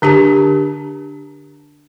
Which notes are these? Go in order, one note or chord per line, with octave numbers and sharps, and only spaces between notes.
D3 D4 G4 A5